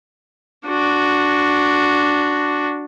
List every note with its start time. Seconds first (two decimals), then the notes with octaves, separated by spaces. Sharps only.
0.66 D4 F#4